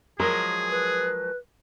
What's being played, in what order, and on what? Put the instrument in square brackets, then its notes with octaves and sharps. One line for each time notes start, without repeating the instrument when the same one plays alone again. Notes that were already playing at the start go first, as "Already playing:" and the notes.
[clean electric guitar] F3 F#3 G#3 [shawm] G#4 [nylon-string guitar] A#4
[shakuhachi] B4